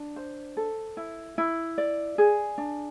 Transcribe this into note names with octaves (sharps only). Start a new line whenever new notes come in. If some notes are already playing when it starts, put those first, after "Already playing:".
Already playing: D4
C5
A4
E4
E4
D5
G#4
D4